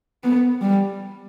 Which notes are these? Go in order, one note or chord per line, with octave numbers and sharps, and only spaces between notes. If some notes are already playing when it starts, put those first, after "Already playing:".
B3
G3